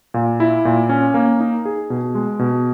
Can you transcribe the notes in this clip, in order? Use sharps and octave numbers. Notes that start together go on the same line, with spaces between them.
A#2
E4
A#2
C#4
A#3
D#4
G#4
B2
G#3
B2